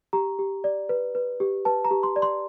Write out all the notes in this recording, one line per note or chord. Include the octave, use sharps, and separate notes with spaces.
G4 A#5
G4
D5
B4
B4
G4
B4 A5
A#5
G4
C6
D5
C6